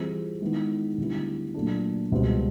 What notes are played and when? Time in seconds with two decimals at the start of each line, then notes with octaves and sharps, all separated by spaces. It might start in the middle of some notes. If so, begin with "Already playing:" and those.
Already playing: E3 G3 C4 F4 G#4
0.42 D#3 G#3 B3 E4
0.98 D2 D3 G3 B3 E4
1.54 A#2 F#3 A3 D4
2.12 C#2 B2 G3 C4 F4